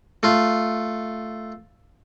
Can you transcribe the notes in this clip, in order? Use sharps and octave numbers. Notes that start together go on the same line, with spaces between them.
A3 F4